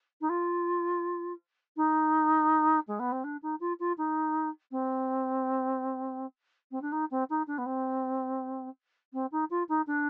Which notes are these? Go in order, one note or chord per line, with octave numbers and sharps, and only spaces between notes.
D#4
F4
D#4
G#3
B3
C4
D4
D#4
F4
F4
D#4
C4
C4
D4
D#4
C4
D#4
D4
B3
C4
C4
D#4
F4
D#4
D4